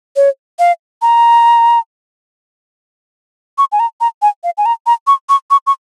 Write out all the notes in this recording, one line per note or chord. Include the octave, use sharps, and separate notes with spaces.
C#5
F5
A#5
C#6
G#5
A#5
A#5
G#5
F5
G#5
A#5
A#5
C#6
C#6
C#6
C#6